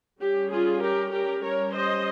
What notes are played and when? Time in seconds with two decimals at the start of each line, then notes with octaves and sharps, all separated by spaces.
0.20 G3 C#4 G4
0.51 F4 G#4
0.82 G4 A#4
1.12 G4 A#4
1.43 G3 C#4 A#4 C#5
1.73 C5 D#5